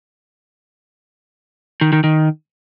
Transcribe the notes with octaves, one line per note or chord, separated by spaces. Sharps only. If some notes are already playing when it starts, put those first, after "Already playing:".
D#3
D#3
D#3